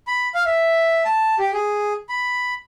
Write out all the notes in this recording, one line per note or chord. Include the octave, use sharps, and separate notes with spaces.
B5
F5
E5
A5
G4
G#4
B5